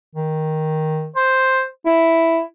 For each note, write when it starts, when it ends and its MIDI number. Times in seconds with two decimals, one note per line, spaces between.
0.15 1.08 51
1.16 1.63 72
1.86 2.41 64